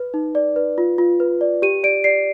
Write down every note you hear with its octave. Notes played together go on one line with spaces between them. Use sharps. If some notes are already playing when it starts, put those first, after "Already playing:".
Already playing: B4
D#4
D5
B4
F4
F4
B4
D5
G4 D#7
D5 D7
D5 C7